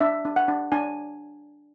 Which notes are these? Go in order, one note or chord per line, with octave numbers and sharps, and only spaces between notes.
D4 E5
D4
F#5
D4
D4 G#5